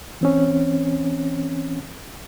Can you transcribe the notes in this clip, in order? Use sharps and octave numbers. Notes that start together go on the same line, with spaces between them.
E3 C4 C#4